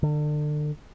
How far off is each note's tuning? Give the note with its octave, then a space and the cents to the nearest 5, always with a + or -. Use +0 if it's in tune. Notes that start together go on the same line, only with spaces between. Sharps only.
D3 +30